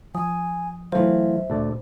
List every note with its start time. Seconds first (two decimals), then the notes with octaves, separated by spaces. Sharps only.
0.15 F3 G#5 D#6
0.92 E3 F#3 A3 F4 C5 E5
1.50 D2 A#2 A4 D5